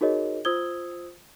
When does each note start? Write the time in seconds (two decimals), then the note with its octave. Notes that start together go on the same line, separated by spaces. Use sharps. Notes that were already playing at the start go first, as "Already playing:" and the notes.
0.01 D#4 F#4 G#4 A#4 C#5 D#5
0.45 F4 C5 D#6 E6 G#6 G7